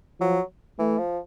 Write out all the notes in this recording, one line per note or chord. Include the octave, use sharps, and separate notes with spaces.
F3 F#3
E3 A3
F3